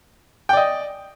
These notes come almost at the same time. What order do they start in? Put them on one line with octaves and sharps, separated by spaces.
G5 D5 D#5